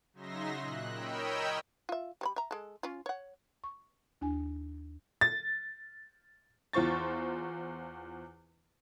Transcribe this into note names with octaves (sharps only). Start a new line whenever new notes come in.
C#3 F#3 D#4 E5 C6 A#6
A#2 F#6
A#4 C#5 D#5 G5 B5 E6
F4 E5
G3 C#5 B5
E5 A#5
G#3 A4
C#4 F4
C#5 F#5
C#6
D#2 D4 E4 G#5
A6
E2 F4 C5 C#6 A6